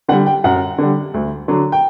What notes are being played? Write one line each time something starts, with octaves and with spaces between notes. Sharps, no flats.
D3 G3 F#5
G5
F#2 F#5
D3 G3
D2
D3 F#3
G5